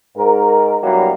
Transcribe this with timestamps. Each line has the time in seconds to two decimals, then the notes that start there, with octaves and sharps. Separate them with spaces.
0.16 G#2 A#4
0.83 G2 B2 F#3 G3 A#3 E4